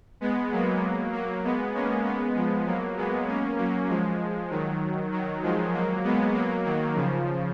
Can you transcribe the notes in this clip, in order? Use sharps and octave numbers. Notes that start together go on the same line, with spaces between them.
G#3 B3
F#3 A#3
F#3 A#3
G#3 B3
A#3 C#4
G#3 B3
F3 G#3
F#3 A#3
G#3 B3
A#3 C#4
F#3 A#3
F3 G#3
D#3 F#3
D#3 F#3
F3 G#3
F#3 A#3
G#3 B3
F#3 A#3
D#3 F#3
C#3 F3